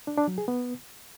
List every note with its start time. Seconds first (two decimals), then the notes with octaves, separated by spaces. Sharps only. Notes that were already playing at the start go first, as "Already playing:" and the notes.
0.07 D4
0.17 D4
0.28 F#3
0.38 G#4
0.48 B3